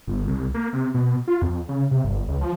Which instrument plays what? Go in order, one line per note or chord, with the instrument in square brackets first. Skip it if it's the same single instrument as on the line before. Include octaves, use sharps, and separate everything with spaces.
[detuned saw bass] G1
C2
A#3
C3
B2
F4
F2
C#3
C3
G1
C#2
F3